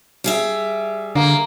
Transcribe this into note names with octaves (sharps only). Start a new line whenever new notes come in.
G3 G#4 E5
D3 A#3